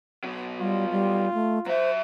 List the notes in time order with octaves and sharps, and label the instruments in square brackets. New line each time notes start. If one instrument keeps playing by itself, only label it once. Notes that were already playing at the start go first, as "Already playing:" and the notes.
[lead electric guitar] B2 F#3
[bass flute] G3 [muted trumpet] F4
[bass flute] G3
A3
[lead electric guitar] F#3 E5 [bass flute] C5